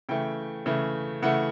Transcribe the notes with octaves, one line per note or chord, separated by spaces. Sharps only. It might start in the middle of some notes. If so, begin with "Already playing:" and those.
C#3 E3 A3 G5
C#3 E3 A3
C#3 E3 A3 F#5